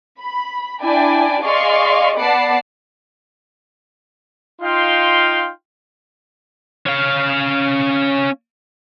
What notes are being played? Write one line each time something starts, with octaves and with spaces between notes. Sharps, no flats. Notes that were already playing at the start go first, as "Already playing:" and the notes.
B5
D4 E4 D5 G5 G#5
G#4 D5 D#5 F5 C6 C#6
B3 D5 F#5 A5 B5 C7
D#4 F4 F5 G5 C6
C#4 F5